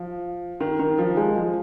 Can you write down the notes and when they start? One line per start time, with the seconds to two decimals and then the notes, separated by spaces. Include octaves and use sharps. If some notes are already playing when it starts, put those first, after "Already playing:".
Already playing: F3
0.60 D#3
0.79 D#3
0.98 F3
1.17 G#3
1.36 F3